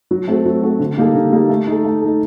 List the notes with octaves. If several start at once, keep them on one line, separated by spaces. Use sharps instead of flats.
F#3
A3 C4 F#4 A4
F#3
A3 C4 F#4 A4
D3
G3 A#3 D#4 A4
D3
G3 A#3 D#4 A4
A3
D#4 A4
A3
D#4 A4